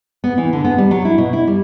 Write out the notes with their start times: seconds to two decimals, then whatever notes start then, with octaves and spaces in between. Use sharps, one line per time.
0.24 B3
0.38 E3
0.53 D3
0.64 B3
0.78 G3
0.91 F#3
1.05 E4
1.18 B2
1.33 E4
1.47 G3